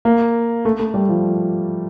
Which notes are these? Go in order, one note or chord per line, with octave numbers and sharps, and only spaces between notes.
A#3
A3
A3
G3
F3